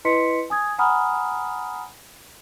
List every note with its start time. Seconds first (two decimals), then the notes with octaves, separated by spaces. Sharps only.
0.05 E4 B4 D#5 C6 B6 C#7
0.50 G#5 D#6 G#6
0.78 F#5 G#5 A#5 B5 D#6 F6